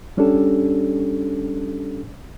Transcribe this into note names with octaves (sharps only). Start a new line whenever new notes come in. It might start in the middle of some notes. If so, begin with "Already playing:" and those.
G3 C#4 D4 G4 A4